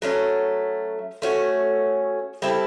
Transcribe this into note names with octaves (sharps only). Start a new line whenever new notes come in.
F#3 A3 C#4
A3 C#4 F#4
G3 C4 E4 A4